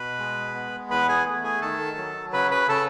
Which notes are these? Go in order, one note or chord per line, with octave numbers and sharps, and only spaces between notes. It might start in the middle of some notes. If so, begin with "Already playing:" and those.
Already playing: B2 B4 B5
G#3
B3
E2 B4 B5
G#4 G#5
A3
G#4 G#5
D#3 A4 A5
F#3
C#3 B4 B5
B4 B5
C#3 A4 A5